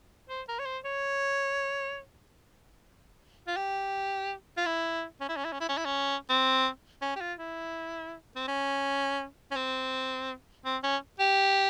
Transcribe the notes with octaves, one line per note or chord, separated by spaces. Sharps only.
C5
A#4
C#5
C5
C#5
F4
G4
F4
E4
C#4
E4
C#4
E4
C#4
E4
C#4
E4
C#4
C4
C#4
G4
F4
E4
C4
C#4
C#4
C4
C4
C#4
G4